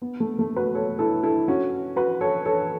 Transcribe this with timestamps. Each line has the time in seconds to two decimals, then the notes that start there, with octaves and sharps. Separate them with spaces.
0.02 B3
0.20 A3
0.39 A3
0.56 F#4 B4
0.75 A4 C#5
0.99 E4 A4
1.23 E4 A4
1.48 C#4 F#4
1.96 F#4 B4
2.21 A4 C#5
2.45 A4 C#5